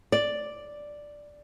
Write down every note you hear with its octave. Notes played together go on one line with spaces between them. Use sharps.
D5